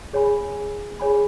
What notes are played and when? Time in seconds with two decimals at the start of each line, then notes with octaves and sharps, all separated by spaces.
0.13 G#4 C#5 G#5 B5
1.00 G#4 C#5 G#5 B5